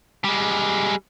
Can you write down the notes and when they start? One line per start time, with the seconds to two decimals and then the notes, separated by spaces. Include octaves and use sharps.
0.24 G3 G#3